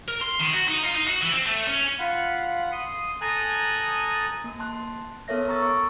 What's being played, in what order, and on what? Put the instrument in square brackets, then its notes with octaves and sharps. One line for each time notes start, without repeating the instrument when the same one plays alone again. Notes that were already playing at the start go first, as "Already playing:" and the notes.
[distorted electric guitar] A#4
C6
D#3
F#4
D#4
F4
D#4
F#4
E3
C4
A3
C#4
[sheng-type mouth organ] F4 F#5 B5
C6 D#6
A4 G#5 A#5 D#6 F#6
[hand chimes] A#3
A5 C6 F#6
B3 A4 A#4 C#5 E5 A#6
A4 A#5 C#6 E6 A6
C#6 D6